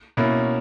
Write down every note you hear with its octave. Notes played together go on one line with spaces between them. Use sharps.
B2 A#3 C#4 E4